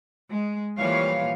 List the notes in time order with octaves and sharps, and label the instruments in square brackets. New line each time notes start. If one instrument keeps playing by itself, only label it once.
[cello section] G#3
A#2 E3 F3 G3 C#5 F5